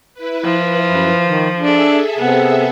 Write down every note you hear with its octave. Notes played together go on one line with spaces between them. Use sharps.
E4 B4
F3
F#2
D#3
D4 G#4 A4 E5
C3 B3